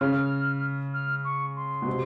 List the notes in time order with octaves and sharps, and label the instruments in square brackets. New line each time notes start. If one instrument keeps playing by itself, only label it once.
[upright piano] C#3 [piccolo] F6
[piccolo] F6
C#6
C6
[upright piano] B2
C3